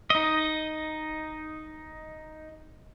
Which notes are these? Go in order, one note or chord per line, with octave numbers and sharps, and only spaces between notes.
D#4 D#5